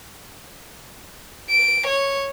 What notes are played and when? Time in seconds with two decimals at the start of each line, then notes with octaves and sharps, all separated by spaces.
1.50 D7
1.87 C#5